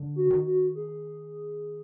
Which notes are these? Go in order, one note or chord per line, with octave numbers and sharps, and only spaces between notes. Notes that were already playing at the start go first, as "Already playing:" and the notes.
Already playing: D3
F#4
D#3
F#4
G#4